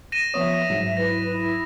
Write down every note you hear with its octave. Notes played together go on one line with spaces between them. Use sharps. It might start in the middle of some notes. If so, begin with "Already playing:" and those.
A#6 D#7 E7
F3 B3 C#5 E5 D#6
G#2 F#3
E4 B4 A#6
E4